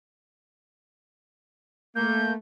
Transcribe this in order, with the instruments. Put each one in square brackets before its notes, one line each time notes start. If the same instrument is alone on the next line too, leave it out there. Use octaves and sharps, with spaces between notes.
[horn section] A3 A#3 [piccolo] G6